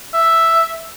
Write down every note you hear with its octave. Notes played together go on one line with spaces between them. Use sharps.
E5